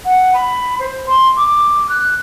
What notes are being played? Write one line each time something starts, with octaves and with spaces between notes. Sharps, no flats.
F#5
B5
C5
C6
D6
F#6